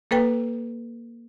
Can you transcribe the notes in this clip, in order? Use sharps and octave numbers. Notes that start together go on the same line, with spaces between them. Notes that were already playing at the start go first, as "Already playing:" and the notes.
A#3 A4 B4 G5